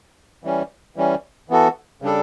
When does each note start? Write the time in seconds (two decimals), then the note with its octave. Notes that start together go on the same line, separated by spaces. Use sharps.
0.44 E3 G3 C#4
0.96 E3 G3 C#4
1.49 E3 B3 F#4 A4
2.02 C#3 G3 D4 A4